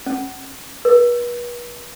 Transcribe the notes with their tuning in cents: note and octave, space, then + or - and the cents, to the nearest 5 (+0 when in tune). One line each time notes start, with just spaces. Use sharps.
C#4 -40
B4 -40